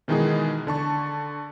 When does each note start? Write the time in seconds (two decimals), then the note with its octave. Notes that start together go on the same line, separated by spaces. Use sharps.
0.08 B2 D#3 E3 G#3 D#4 G#4
0.67 D3 A5 C#6